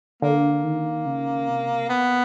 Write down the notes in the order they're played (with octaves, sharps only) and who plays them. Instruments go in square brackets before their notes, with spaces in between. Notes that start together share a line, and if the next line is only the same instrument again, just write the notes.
[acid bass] D3 [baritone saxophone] A#3
[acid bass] D#3
C#3
C3
[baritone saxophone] B3